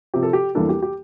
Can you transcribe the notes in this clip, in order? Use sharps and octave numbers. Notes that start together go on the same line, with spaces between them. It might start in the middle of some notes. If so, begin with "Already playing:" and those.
C3 F3 C4 G4
A4
G4
E2 E3 G3 A#3 D4 A4
G4
G4